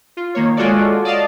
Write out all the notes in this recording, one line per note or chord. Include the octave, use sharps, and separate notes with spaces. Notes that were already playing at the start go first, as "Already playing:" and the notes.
F4
D#3 A#3 C#5
G#3 F4 F#4 A4 C#5 D5
D5 D#5 F5 A5